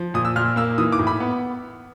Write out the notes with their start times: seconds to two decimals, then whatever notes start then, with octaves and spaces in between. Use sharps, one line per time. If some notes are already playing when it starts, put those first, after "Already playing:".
Already playing: F3
0.14 A#2 D#6
0.25 E6
0.36 A#2 F6
0.56 A#3 E6
0.78 E3 D#6
0.92 D6
0.99 A2
1.07 B5
1.20 B3